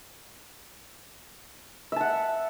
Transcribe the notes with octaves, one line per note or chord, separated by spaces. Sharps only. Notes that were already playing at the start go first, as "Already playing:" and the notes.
E5 F#5 A5